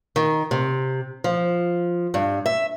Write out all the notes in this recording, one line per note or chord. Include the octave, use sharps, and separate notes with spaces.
D#3
C3
F3
G2
E5